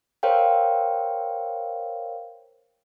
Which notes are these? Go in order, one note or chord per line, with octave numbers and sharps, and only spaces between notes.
A#4 C5 C#5 F5 G5